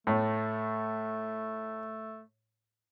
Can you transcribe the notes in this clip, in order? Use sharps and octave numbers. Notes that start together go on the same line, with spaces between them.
A2 A3